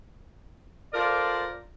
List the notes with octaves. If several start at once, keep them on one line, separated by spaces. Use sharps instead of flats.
F4 A4 A#4 C5 D5